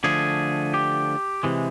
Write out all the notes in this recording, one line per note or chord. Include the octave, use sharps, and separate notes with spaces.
D3 F3 A3 G#4
G4
C3 E3 G#3